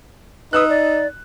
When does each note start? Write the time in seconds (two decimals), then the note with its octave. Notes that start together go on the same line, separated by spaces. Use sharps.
0.53 D#4 B4 D#6 E6 F#6
0.70 D5